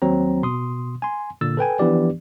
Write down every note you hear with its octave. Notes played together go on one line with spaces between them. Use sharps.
D#2 F#3 C4 A#5
B2 C6 D#6
G#5 C6
A#2 D3 E6 A6
A4 B4 G5 G#5
E3 F3 B3 D4 G4 D5